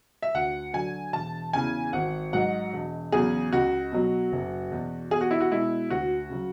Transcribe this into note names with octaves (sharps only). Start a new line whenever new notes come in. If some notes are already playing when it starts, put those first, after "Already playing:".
E5
D2 F#5
D3 F#3 G#5
E1 A5
E2 C#3 E3 G#5
G#1 F#5
G#2 F#3 F#5
E1
E2 C#3 F#3 G#4
C#2 F#4
B2 F#3
F#1
E2 B2
E2 G#4
F#4
E4
F#4
B2 G#3 E4
D2 F#4
C#3 F#3